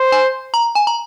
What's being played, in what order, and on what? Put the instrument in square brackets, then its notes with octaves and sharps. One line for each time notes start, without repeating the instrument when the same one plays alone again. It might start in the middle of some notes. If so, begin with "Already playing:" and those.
Already playing: [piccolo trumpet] C5
[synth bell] G#5
A#5
G#5
A#5